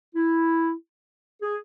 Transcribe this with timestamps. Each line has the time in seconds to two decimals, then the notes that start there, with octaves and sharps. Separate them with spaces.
0.15 E4
1.42 G#4